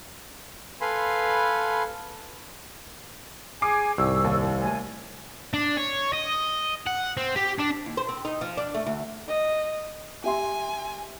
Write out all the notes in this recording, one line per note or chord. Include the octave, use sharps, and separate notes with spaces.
A4 B4 F5 G#5 B5 C6
G#4 G#5 D6 C7
C2 G#2 C#6 E6
D#2
A3 G#5
D4
C#5
D#5
F#5
C4
G4
D4
D#2
C5
C4
D#4
F3
D4
A3
D2
D#5
G4 E5 G#5 C6